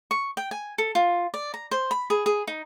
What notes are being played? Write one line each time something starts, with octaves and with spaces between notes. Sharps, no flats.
C#6
G5
G#5
A4
F4
D5
A#5
C5
B5
G#4
G#4
D#4